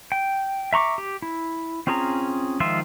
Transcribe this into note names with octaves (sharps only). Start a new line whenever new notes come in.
G5
E5 A#5 C#6 D6
G4
E4
C4 C#4 F4 G#4 A#5
D#3 F3 G#3 F4 E5